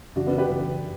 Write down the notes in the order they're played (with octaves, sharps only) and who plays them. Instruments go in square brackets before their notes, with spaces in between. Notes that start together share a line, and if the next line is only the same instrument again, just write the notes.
[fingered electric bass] F#2 C#3 E3 [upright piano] D4 F#4
[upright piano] B3 D4
G4 B4
[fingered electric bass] F#2 C#3 E3